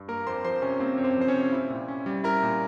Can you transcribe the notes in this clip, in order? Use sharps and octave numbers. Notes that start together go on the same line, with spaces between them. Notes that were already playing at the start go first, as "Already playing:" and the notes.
Already playing: G2
A#3 A#4 A#5
F2 C5 C6
F3 C5 C6
C3 C#4 C#5
A#3 C4 C5
F2 C#5
C4 C5
F3 C5
C#4 C#5
C3
E4
A#2
C#4
G3
E4 A#4 A#5
A#2